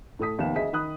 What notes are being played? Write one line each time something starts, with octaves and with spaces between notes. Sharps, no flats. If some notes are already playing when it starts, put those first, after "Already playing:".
A2 A4 D#6 B6
F1 D#2 B3 E7
D2 G#4 D#5 E5 B6
D#3 B5 D#6 F#6